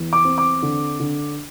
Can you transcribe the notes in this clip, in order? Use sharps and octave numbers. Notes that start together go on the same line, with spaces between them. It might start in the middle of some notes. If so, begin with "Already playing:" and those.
Already playing: E2
D6
C4
D6
D3
D3